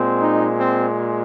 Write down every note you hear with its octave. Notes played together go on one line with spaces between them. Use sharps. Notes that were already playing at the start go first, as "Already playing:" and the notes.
Already playing: A#2 G#3 C4
D#4
C4